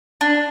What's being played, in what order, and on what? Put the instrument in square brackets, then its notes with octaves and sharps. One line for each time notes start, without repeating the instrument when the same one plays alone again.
[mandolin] D4